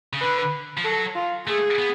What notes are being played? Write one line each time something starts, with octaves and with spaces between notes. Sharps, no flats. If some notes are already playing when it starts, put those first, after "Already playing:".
C#3
D3 B4
F3
F#3 A4
F4
A3 G#4
B3